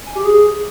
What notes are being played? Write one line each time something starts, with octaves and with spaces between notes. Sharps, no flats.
G#5
G4
G#4